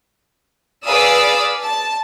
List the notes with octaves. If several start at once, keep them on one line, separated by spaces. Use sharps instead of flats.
G#4 B4 D5 F5 D#6 E6
A5